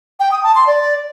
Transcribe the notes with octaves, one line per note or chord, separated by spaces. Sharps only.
G5
D#6
A5
C6
D5